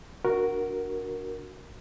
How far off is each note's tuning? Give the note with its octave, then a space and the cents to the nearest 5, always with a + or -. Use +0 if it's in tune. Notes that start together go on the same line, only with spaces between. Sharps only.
D4 +0 F#4 +0 A#4 +5